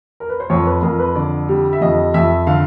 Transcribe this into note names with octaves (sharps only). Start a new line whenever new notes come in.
A#4
B4
C5
F2 C#5
B4
F2 A#4
B4
D3 D5
G3
E5
F2 D#5
F2 E5
D3 F5